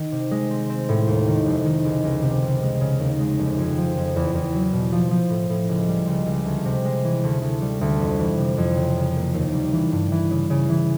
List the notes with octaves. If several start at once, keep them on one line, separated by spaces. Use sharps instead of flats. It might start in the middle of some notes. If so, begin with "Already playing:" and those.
Already playing: D#3
C3
G#3
C4
C4
A2
D#2
D#3
F1
D#3
C#2
C#2
C3
C#2
G#3
C#3
D#2
G#3
F1
F2
F3
F2
E2
E2
F#3
B2
F3
F3
A2
A2
C#2
G3
C#2
C#2
D2
C3
G#3
E3
D2
D2
G3
D2
F2
E3
C3
F2
C#3
C#3
A#3
D#2
G3
E3
G2
E3
C#3
C#3
E3